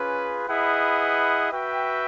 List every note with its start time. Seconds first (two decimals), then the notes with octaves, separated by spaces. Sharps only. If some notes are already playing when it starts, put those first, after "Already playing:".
Already playing: C#4 F4 G#4 B4
0.48 E4 G#4 B4 D#5 F#5
1.51 F#4 B4 E5 G5